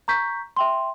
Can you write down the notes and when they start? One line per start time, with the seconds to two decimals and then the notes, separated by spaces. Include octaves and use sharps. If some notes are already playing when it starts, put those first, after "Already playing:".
0.08 A#5 C#6 G6 B6
0.57 E5 G5 C6